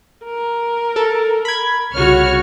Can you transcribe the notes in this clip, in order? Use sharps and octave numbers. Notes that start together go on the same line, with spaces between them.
A#4
A4
B5 G#6
C2 C#3 F#4 C#5 F6